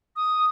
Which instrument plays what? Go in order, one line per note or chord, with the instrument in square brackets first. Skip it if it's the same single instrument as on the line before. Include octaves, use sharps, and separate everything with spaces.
[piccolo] D#6